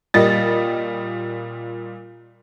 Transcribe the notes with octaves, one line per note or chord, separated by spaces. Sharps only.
A#2 G3 D#5 A6